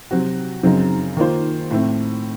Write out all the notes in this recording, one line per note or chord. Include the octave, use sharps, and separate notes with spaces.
C3 F#3 C4 F#4
F#2 C#3 F#3 C4 D#4
D#3 A#3 F4 C5
A2 A3 C4